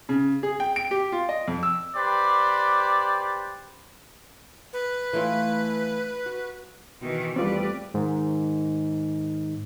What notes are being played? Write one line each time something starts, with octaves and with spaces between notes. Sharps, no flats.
C#3
G#4
G5
D7
G4
F4
D#5
F2
E6
G4 B4 C5 D5
B4
E3 A3 F4
F#4
B2 D#3 E3
E2 G3 A3 C4 F4 B4 D5
G#2 D#3